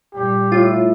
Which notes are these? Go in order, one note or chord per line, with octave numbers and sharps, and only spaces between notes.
A#2 G3 G4
A2 F4